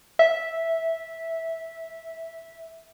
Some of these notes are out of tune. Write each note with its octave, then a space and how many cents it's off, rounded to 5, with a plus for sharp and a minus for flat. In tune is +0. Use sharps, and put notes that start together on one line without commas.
E5 -10